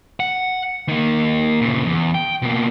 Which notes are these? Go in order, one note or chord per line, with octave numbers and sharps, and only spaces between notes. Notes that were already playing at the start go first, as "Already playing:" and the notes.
F#5
D#3 A#3
A#2 C#3
E2
G5
B2 A#3